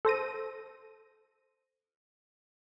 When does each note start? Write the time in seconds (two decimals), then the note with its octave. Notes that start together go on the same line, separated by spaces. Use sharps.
0.05 A4 C5 A#6 D#7